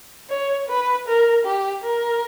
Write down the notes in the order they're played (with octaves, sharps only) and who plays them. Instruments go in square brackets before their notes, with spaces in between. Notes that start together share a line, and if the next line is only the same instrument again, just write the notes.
[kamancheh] C#5
B4
A#4
G4
A#4